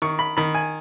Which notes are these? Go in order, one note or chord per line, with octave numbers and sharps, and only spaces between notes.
D#3 C#6
B5
D#3 B5
G#5